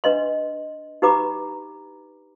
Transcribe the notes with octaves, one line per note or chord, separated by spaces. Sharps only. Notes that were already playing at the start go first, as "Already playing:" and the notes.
D4 B4 D#5 C6
D#4 G4 B4 A#5 B5 D6